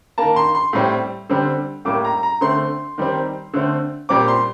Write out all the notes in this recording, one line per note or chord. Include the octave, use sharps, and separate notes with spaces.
D#3 A#3 A5
C6
C6
A2 G3 C4
D3 G3 C4
A2 G3 A#3 D6
A#5
A#5
D3 A3 C4 C6
D#3 G3 C4
D3 A3 C4
A#2 G3 C4 D6
C6